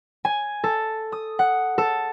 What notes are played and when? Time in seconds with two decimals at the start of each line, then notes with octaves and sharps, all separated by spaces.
0.25 G#5
0.64 A4
1.12 D#6
1.39 F#5
1.78 A4